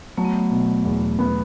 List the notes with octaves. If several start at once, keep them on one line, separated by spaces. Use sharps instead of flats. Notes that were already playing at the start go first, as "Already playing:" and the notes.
F#3 A3
B3
A3
B2
E2
B3